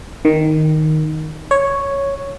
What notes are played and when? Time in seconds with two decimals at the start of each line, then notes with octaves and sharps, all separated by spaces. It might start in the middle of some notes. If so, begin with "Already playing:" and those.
0.25 D#3
1.51 C#5